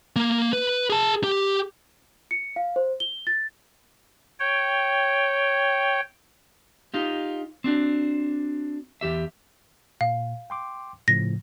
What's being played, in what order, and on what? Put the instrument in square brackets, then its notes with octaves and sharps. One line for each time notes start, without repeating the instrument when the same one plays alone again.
[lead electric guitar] A#3
B4
G#4 A5
G4
[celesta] C#7
F5
C5
G7
A6
[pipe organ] C#5 G5
[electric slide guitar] D#4 F4 G4
C4 D4 F#4
E2 G4 E5
[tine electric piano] A#2 [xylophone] F5
[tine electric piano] G5 C6 D6
[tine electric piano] A2 C#3 F3 [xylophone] A#6